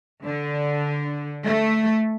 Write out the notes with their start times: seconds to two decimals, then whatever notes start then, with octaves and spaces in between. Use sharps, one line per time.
0.24 D3
1.45 A3